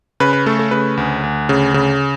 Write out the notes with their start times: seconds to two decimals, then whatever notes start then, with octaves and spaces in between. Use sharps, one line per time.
0.20 C#3 B4
0.33 B4
0.46 A3 A4
0.59 A4
0.71 C#3 B4
0.97 D2
1.23 D2
1.49 C#3
1.74 C#3